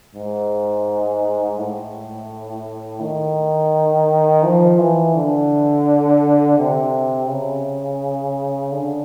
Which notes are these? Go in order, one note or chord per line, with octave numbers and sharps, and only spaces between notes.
G#2
A2
D#3
F3
E3
D3
C3
C#3
D3